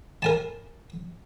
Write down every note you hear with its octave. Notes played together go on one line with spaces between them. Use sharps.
A#4 G#5 A5